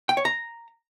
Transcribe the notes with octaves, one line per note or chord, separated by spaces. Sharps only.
G5
C#5
A#5